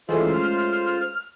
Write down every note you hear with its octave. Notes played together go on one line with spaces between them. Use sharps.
E3 G#3 A3 C#4 F4 C5
F6